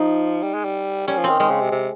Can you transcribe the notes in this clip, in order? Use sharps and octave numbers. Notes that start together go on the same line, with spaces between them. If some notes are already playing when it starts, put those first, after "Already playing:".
Already playing: F3 D#4
G3
G#3
G3
G3 C#4
F3
C4
D#3
D#3 G#3
C#3
C3
C3